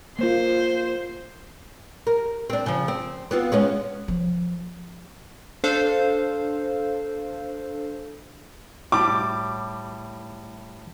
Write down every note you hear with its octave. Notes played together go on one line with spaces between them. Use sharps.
A#3 F4 C5
A#4
C4 D4
C#3 F3
C4
B3 C4 F4
G#3 B3 C#4
F3
D4 A4 C5 F5
A2 G3 D6